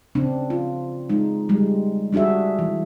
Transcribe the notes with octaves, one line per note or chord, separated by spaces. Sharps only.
C#3 C4 D4
F4
G#3 D#4
G3 G#3
G3 D4 F#4 G#4 E5
E3